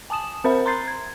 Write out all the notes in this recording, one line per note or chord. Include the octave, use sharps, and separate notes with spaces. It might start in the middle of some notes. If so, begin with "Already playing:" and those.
G#5 A5 D#6 E7
C4 A#4 C5 E5 B5
A#5 C6 G6 A6 C7
G#6